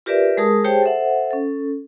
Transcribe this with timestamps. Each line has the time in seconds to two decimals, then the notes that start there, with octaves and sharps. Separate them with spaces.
0.06 F4 G4 A#4 B4 D5 E5
0.37 G#3 G#4 A#4 A5 D#6
0.64 G4 G#4 C5 C#5 G5 A5
0.83 A4 C5 E5 F#5
1.31 C#4 A4